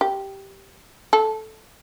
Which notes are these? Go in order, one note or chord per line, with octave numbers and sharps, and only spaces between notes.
G4
A4